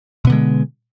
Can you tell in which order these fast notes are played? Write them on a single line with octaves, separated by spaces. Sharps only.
B2 B3 D3 G#3